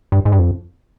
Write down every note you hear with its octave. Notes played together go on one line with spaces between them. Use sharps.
G2
G#2
G2
F2